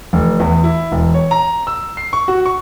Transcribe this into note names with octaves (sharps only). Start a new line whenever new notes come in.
F1
E2
E4
E1
C#5
A#5
E6
C7
C#6
F#4
C#6